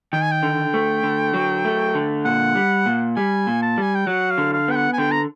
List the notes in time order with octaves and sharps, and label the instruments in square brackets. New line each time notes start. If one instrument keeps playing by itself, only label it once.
[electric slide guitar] D#3 [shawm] G5
[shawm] G#5
G5
[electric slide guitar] D3
A3
D3
F#3
A3
D3
[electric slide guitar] A#2 [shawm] F#5
[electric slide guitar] G3
A#2
[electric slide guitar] G3 [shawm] G#5
[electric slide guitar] A#2
[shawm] A5
[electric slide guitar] G3 [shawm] G#5
[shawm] G5
[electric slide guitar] F#3 [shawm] F#5
[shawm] F5
[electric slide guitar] D3
[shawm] F5
[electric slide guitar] B3 [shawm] G5
[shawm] F#5
G#5
[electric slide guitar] D3 [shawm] G5
[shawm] A#5